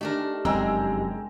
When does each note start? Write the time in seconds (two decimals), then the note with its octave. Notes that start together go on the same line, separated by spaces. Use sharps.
0.01 A3 D4 D#4 G4 A#4
0.45 F1 F#2 G#3 C4 G5 A#5 E6